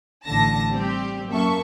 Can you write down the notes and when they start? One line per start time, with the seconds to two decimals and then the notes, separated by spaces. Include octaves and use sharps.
0.26 A1 D3 A5 A#6
0.71 G3 C4 G4
1.29 F#2 A#3 A4 E5 C#6